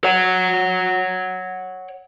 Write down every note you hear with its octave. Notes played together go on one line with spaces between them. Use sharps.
C#5 F#5